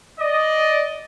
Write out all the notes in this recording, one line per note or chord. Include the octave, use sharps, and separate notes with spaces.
D5 D#5